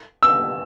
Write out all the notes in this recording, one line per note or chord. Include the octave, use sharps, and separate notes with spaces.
E6